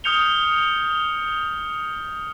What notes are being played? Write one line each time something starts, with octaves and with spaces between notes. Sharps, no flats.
D#6 F6 G6 C#7 F7 G7